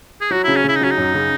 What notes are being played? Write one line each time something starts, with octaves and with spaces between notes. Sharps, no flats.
G#4
F#3 F#4
C#3 E4
C#4
C#3 E4
D#4
F#3 C#4
D#4
F#2
C#3